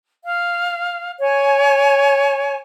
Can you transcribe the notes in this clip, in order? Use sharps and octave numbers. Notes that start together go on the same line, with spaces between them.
F5
C#5 G#5